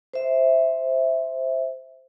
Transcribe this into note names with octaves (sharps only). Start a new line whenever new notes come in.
C5 E5